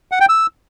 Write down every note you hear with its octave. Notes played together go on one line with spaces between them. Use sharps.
F#5
G5
E6